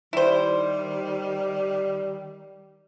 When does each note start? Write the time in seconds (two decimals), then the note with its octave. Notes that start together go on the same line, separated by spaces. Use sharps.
0.13 D#3 G3 E4 C5